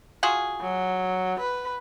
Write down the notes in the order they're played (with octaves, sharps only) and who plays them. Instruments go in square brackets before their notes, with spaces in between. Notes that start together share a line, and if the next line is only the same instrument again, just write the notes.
[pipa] F4 F#4 G#4
[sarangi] F#3
B4